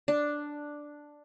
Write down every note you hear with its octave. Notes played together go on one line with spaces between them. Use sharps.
D4